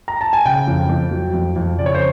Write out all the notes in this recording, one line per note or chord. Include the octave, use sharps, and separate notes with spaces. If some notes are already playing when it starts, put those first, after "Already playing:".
A#5
A5
G#5
C#3 G5
F2
F2
F#3
F2
F2
C#3 D5
C#5
C5